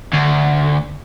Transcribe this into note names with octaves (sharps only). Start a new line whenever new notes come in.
D2